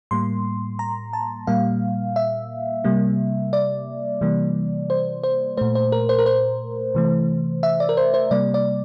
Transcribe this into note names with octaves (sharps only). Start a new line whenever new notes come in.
A2 G3 A#3 C6
A#5
A5
A#2 G3 A#3 F5
E5
C3 G3 A#3
D5
C3 E3 G3 A#3
C5
C5
A#2 A3 C5
C5
A#4
C5
A#4
C5
C3 E3 A3
E5
D5
A#4
C5
C5
C3 G3 A#3 D5
D5